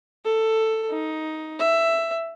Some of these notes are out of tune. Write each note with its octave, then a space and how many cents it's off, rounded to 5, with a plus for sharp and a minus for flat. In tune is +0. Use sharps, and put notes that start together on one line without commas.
A4 +10
D#4 +10
E5 +10